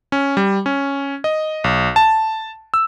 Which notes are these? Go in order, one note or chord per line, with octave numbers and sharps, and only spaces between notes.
C#4
G3
C#4
D#5
B1
A5
E6